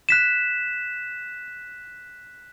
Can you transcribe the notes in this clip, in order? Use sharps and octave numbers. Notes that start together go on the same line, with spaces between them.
F#6 B6 E7